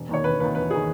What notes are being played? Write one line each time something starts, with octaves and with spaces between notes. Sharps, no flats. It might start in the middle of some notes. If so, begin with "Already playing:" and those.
Already playing: E1
D#2 D#3 C#5
E1 B4
D#2 D#3 B4
E1 B4
D#3 G#4